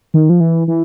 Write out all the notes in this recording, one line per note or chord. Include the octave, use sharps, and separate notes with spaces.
D#3
F3
E3
E3